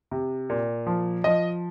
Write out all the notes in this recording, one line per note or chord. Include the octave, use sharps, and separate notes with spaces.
C3
A#2
F3
F3 D#5